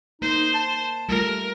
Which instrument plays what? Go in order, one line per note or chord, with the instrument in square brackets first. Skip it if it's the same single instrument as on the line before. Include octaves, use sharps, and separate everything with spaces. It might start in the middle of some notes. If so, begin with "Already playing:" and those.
[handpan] A#3 [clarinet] D#4 [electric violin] C5
[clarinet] A5
[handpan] G3 A3 F4 [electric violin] A#4